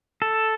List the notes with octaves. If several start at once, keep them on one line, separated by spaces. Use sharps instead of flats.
A4